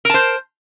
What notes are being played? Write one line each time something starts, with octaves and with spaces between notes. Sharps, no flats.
A#4 C5 A5